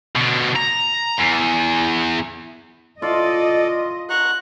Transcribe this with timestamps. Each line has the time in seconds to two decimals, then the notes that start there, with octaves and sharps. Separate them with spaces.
0.16 B2 D3
0.56 A#5
1.19 E2
3.02 F4 A4 D5 D#5
4.10 F#5 A#5 C#6 F#6